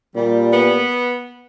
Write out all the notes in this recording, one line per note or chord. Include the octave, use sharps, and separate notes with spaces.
A#2 G3
B3